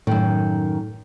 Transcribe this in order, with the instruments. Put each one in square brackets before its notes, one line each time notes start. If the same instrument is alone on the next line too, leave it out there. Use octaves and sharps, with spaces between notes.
[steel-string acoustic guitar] F#2 D#3 [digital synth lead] A2